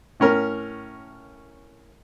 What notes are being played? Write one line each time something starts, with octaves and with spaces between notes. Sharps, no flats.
A2 C#4 A#4